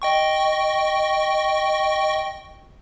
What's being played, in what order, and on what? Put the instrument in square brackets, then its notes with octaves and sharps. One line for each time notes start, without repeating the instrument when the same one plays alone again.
[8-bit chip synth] D#5 G5 C#6